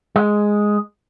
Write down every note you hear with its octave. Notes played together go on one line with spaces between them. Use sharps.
G#3